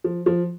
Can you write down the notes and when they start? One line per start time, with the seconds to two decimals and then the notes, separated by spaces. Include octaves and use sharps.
0.04 F3
0.26 F3